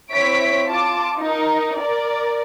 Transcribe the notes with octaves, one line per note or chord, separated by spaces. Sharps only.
C4 E4 C#5 B6 D7
F4 A5 D6
D#4 A#4
A#4 D5